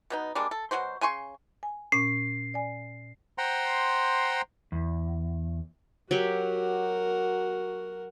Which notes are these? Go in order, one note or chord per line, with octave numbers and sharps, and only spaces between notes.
B2 B3 D#4
G3 G#3 A#3 D4
A4
B2 F#3 F#4 C5
C#3 G#5 C6 C#6
G#5
A#2 C#4 C7
D5 G#5
C5 F#5 G5 A#5 C6
E2
F#3 F#4 G4 A#4